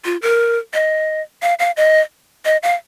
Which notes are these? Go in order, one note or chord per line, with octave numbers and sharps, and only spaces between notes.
F4
A#4
D#5
F5
F5
D#5
D#5
F5